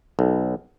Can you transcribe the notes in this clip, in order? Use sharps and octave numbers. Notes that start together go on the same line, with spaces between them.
B1